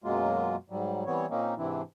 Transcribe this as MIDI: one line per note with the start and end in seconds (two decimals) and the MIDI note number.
0.04 0.56 42
0.04 0.56 47
0.04 0.56 54
0.04 0.56 56
0.04 0.56 58
0.04 0.56 65
0.70 1.04 44
0.70 1.04 54
0.70 1.04 55
1.06 1.26 52
1.06 1.26 55
1.06 1.26 59
1.06 1.26 60
1.06 1.26 73
1.30 1.54 46
1.30 1.54 58
1.30 1.54 60
1.30 1.54 61
1.30 1.54 63
1.58 1.82 44
1.58 1.82 48
1.58 1.82 52
1.58 1.82 60
1.58 1.82 62
1.58 1.82 64